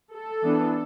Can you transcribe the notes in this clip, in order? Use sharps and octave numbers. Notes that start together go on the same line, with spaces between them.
A4
E3 B3 D4